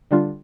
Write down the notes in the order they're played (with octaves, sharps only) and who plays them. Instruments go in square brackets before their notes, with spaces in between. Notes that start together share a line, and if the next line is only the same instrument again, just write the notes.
[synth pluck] D3 G3 D4 F4